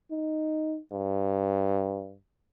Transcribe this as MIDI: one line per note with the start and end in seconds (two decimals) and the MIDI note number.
0.11 0.79 63
0.92 2.15 43